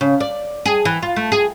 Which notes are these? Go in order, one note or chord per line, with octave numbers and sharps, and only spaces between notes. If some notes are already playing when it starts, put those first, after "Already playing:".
C#3
D5
G#4
E3
F4
A3
G#4